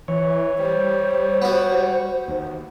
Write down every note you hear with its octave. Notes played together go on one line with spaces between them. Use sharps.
E3 C#5
G3 C5
B3 F#4
D#2